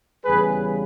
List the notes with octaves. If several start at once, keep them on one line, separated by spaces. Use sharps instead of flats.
E2 C#3 G3 G#4 B4